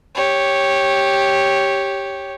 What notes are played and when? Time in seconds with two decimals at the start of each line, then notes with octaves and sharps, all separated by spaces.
0.15 G4 C#5